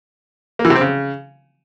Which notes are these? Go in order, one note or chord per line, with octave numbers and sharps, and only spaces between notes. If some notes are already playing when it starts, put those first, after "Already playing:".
A#3
E3
C3
C4
C#3